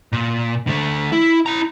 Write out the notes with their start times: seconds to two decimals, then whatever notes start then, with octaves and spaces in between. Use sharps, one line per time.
0.12 A#2
0.67 D3 A3
1.12 E4
1.46 E4 A#5